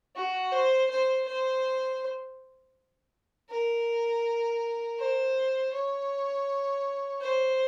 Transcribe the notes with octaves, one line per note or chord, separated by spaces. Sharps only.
F#4
C5
C5
C5
A#4
C5
C#5
C5